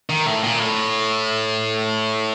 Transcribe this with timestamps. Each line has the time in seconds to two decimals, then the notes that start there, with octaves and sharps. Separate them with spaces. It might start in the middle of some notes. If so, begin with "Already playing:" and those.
0.10 D#3
0.26 A2
0.44 A#2
0.60 A2